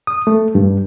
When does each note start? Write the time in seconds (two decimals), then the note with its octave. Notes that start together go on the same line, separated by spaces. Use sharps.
0.07 D#6
0.27 A3
0.55 G2